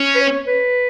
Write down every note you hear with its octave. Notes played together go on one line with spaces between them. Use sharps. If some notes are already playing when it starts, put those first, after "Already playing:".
Already playing: C#4
B4
C#5
B4